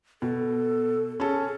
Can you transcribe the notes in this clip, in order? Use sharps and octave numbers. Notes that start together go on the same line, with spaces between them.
B2 A4
C#4 G#4 A4